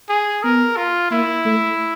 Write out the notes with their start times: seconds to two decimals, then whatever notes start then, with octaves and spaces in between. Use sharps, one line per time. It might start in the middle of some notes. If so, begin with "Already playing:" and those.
0.09 G#4
0.43 B3 A#4
0.77 F4
1.11 A#3 E4
1.45 A3